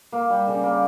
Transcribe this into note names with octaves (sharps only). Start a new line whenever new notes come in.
A#3
G3
C#3
A#3